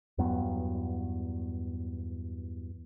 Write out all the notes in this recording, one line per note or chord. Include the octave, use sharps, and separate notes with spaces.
E2 G2 F#3 B3